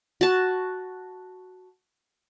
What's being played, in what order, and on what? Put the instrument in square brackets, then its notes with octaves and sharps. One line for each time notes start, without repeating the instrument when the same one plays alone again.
[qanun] F#4 A5